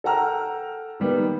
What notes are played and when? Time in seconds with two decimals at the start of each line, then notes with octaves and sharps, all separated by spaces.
0.04 A4 F#5 G5 A#5 E6 F6
1.00 D#3 G3 A#3 B3